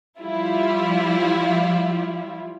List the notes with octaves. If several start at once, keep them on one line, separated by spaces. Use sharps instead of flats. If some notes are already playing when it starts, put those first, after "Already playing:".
F3 G3 E4 F4